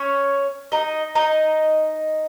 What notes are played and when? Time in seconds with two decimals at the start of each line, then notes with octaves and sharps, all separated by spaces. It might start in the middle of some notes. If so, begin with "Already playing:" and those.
Already playing: C#4 C#5
0.72 D#4 D#5
1.15 D#4 D#5